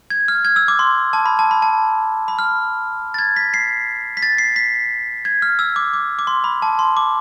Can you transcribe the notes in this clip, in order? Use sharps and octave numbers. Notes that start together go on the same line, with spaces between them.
G#6
F6
G#6
E6
D6
C6
A5
B5
A5
B5
A5
B5
F6
A6
G#6
B6
C7
B6
A6
C7
B6
G#6
F6
E6
D6
D6
D6
C6
B5
A5
C6
D6